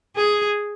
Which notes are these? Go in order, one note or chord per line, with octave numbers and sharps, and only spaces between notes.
G#4